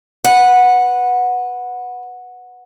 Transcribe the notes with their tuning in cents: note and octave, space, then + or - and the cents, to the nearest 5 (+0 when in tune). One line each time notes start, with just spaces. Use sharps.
B4 +0 F#5 -10